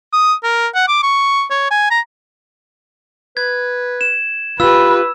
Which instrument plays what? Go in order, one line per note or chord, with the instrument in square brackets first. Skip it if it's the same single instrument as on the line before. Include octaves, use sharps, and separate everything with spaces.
[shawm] D#6
A#4
F#5
D6
C#6
C#5
G#5
A#5
[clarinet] B4 [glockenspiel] G#6
[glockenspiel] E7
[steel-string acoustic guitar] F4 G4 [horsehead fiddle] B4 [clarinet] B5 [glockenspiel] E6